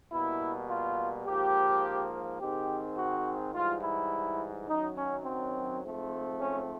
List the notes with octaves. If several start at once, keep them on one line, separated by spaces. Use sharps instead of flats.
B2 G3 A#3 E4
F4
G#2 F3 A#3 G4
G#2 D#3 G#3 C4 G4
F#4
G#2 E3 G3 F4
E4
F#2 D#3 F#3 D#4
C#4
C4
G#2 F3 A3 C4
C#4